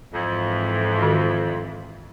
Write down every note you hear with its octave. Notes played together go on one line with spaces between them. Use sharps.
F2 G#2 E3
D#3 F#4 A4